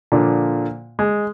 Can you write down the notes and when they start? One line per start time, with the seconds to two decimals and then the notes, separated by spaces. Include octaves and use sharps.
0.12 A#2 D3 F3
0.99 G#3